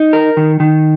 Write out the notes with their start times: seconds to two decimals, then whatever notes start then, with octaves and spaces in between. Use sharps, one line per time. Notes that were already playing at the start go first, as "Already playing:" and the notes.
Already playing: D#4
0.13 A#4
0.37 D#3
0.60 D#3